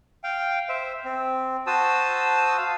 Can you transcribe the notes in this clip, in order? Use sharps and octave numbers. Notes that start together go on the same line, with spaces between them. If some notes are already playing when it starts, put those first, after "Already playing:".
F5 G5
C5 E5
C4
F#4 C5 A5 D#6 E6
F5